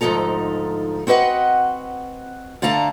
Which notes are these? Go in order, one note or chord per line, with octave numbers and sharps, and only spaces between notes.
D2 G#2 F3 D#4 A4 A#5
C4 F#4 B4 D#5 F#5
D3 A3 F5 A5 A#5